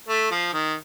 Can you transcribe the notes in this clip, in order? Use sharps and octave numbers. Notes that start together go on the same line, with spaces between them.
A3
F3
D#3